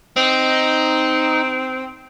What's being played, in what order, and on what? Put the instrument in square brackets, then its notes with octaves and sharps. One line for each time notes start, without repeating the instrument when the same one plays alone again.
[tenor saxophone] C4 [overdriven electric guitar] D#4